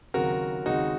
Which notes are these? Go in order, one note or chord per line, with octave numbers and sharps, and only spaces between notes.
D#2 C#3 F#3 C4 F#4 A#4
D#2 C#3 G#3 C4 D#4 F#4